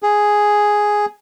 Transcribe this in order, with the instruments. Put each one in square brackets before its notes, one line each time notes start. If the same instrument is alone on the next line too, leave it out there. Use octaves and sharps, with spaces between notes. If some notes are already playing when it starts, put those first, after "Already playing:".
[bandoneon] G#4